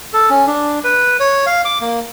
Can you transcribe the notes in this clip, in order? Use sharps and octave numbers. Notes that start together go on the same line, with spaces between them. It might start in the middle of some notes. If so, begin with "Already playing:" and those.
A4
C#4
D4
B4
C#5
F5
D6
A#3